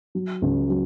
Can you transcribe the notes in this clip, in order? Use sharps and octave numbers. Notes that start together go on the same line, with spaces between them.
F#3
C#2
F#3